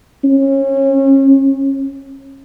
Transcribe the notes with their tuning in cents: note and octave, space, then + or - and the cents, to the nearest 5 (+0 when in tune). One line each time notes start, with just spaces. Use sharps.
C#4 -30